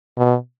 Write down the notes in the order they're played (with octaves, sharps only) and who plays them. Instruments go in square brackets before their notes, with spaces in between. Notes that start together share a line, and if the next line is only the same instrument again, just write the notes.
[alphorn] B2